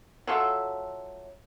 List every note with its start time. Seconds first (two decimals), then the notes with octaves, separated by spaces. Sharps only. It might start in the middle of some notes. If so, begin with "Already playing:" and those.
0.27 F#3 F4 A4 E5